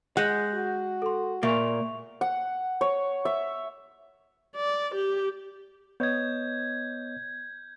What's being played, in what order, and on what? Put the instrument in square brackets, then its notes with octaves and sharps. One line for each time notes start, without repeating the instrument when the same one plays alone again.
[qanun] G#3 [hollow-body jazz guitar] F#5 [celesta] F#6 G6 A#6
[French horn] F#4
[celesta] A4 C6
[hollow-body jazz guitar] A#2 A#3 [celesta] E5 C#6 F7
[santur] F#5
C#5
E5
[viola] D5
G4
[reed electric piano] B3 C#5 D#5 [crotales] G6 G#6